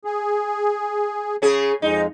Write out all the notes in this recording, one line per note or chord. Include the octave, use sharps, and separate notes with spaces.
G#4
C#3 C#4 G#4
F2 G#3 D#4